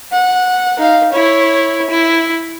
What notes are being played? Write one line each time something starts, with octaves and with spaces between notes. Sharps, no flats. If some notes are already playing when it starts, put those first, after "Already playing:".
F#5
D#4 F5
E4 C#5
E4